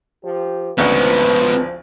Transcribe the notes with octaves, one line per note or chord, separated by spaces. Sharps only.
F3 G4
G#1 D2 C#3 F3 G#3 B3 B4